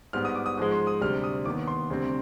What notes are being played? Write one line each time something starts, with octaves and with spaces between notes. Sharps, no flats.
G#2 G3 B3 F6
D#6
D6
D#6
G#2 F3 G#3 D#6
C6
D#6
D2 C3 G3 F6
D#6
D#2 D#3 B3 D6
C6
D2 C3 G3 C4